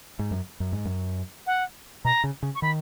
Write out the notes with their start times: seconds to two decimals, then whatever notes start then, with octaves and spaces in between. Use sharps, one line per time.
0.19 G#2
0.31 F#2
0.60 F#2
0.72 G#2
0.85 F#2
1.47 F#5
2.05 B2 A#5
2.24 C#3
2.43 C#3
2.55 C#6
2.62 D#3 B5